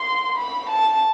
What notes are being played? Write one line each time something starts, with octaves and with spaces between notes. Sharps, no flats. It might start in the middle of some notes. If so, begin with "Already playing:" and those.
Already playing: C6
B5
A5